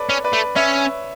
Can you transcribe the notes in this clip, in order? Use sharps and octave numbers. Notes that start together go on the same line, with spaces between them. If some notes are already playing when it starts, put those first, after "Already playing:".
Already playing: A4 B4 C#5 D5
C#4
B4 D5
A3
C#4 C#5 E5